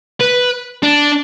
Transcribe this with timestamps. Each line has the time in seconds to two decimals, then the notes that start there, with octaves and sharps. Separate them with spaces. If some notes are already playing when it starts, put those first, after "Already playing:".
0.21 B4
0.83 D4